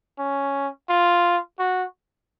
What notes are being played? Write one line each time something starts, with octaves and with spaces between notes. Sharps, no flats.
C#4
F4
F#4